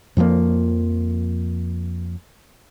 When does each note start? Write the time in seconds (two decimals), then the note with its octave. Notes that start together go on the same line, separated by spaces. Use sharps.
0.17 F2 F3 G#3 A#3